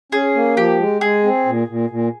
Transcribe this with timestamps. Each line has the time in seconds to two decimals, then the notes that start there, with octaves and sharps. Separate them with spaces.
0.12 C#4 G#4
0.35 A#3
0.57 F3 G4
0.79 G#3
1.01 G#3 G#4
1.23 C4
1.46 A#2
1.68 A#2
1.90 A#2